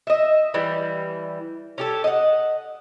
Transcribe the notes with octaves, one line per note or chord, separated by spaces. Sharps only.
D#5 E5
E3 G3
C#4 G4 A4
D#5 F#5